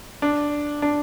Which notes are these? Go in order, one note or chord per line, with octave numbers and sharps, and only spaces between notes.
D4
D4